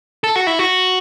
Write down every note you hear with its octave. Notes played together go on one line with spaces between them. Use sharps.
A4
F#4
E4
F#4